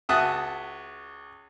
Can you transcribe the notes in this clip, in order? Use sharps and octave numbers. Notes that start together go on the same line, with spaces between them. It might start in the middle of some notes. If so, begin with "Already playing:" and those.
C#2 F#4 E5 A5 D#6 F#6